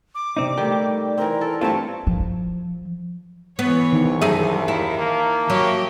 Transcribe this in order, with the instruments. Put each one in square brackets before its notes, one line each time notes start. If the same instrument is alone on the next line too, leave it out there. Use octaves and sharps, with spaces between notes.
[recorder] D6
[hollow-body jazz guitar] C3 C4 D#4 [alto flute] D5
[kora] D#3 G3 [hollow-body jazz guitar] A3 G4
[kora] E3 C4 [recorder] A#4
[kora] A4
[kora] G2 C#5 [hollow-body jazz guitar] A3 C4 F4 [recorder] A5
[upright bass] F3
[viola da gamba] E3 C#5 [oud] B3
[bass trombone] C2 [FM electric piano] D#3
[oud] F#2 D#4 G#4 [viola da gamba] D#3 [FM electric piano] E5 A5
[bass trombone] D#2 [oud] E4
[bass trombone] A#3
[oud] F#3 [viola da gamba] G4 C#5 D#5